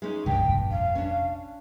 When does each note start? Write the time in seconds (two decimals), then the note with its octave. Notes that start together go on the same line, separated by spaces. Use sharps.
0.02 G#3 C#4 D#4
0.26 F1 C#2 G2 G5
0.46 F1 A#1
0.70 F5
0.95 C#4 D4